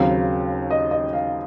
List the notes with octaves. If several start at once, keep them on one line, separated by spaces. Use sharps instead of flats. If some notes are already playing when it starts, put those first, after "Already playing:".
Already playing: D#2 C#3 F#3 C4 F5
D#5
D#5
F5